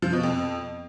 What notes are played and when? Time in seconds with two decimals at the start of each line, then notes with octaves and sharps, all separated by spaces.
0.02 F3
0.13 B2
0.23 F2